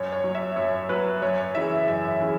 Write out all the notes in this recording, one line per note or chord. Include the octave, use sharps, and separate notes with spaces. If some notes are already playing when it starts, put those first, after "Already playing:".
Already playing: F#2 C#5
C#5
F#3
E5
F#2 C#5
F#3 B4
F#2 C#5
C#3 E3 E5
F#2 E5
C#3 E3